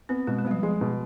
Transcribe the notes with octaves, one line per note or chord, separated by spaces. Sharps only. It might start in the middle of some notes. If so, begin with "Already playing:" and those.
B3 C4
B2 G#3
G#3
G3 B3
F3
F3 G#3
B2